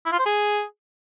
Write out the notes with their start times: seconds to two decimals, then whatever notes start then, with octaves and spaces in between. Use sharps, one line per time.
0.06 E4
0.12 F4
0.19 C5
0.26 G#4